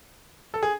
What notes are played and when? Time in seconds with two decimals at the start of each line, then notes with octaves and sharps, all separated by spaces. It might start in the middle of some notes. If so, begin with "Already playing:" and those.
0.54 A4
0.63 G#4